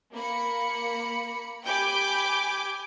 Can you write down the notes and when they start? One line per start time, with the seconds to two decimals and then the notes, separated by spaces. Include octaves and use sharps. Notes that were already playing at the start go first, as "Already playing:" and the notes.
0.13 A#3 B5 C#7
1.65 G4 G5 G#5 B5 D6 G6